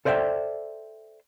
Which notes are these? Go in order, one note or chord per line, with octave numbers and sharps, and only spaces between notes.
A4 C5 D5 E5 F5 G5